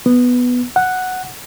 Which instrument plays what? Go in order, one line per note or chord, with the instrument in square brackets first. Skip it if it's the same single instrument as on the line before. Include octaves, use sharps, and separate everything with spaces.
[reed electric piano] B3
F#5